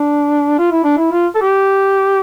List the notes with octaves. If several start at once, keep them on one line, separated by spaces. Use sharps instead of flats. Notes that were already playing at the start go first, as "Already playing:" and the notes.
Already playing: D4
F4
E4
D4
E4
F4
A4
G4